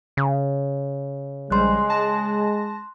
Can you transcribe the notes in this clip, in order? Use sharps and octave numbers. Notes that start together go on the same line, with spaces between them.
C#3
A#1 G3 G#3 C5 C6 F#6
A5 A#6